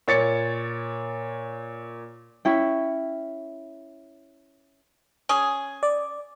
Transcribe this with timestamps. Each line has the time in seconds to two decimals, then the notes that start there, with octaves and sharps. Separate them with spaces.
0.08 A#2 C#5 A6 C#7
2.45 C#4 E4 G5
5.29 C#4 G#4
5.83 D5